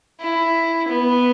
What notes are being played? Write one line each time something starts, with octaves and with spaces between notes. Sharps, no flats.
E4
B3